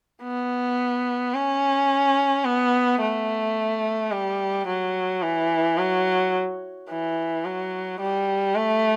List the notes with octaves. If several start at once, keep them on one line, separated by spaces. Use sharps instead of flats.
B3
C#4
B3
A3
G3
F#3
E3
F#3
E3
F#3
G3
A3